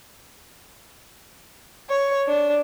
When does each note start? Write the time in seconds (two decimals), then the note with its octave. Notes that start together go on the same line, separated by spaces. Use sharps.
1.89 C#5
2.27 D4